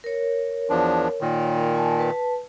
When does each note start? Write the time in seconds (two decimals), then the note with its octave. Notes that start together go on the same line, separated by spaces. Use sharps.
0.04 A#4 C#5
0.70 E2 F3 D4
1.21 A#2 D#3
1.75 G#5 A5
1.99 B4 A5